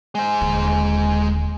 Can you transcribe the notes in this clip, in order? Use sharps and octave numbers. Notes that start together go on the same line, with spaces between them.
G#3 C5
D#1 D3